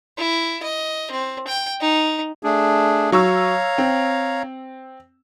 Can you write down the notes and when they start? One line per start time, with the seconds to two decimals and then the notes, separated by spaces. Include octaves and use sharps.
0.18 E4
0.63 D#5
1.11 C4
1.48 G5
1.81 D#4
2.43 A3 D4 G#4
3.12 F#3 C#5 F5 A#5 C#6 E6
3.78 C4